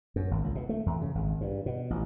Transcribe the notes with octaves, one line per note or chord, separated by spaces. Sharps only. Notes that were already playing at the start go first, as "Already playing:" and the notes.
F#2
G#1
C#2
B2
A3
E2
C#3
G#1
G2
B2
A1